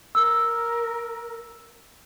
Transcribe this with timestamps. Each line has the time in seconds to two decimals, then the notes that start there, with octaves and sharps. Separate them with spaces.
0.15 A#4 E6